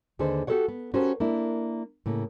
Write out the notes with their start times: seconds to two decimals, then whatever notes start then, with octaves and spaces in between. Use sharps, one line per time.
0.19 D#2 D3 G#4 A4 B4 C5
0.47 F#4 G4 A4 B4 C#5 F#5
0.68 B3
0.94 C#4 F#4 G4 A4 A#4 C5
1.20 A#3 D4 E4
2.06 A2 C#3 A#3